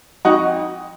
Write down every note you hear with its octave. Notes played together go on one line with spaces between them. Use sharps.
F2 D#4 F#4